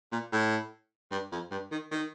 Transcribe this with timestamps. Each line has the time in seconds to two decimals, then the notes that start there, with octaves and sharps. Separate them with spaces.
0.12 A#2
0.33 A2
1.11 G2
1.32 F2
1.51 G2
1.71 D#3
1.91 D#3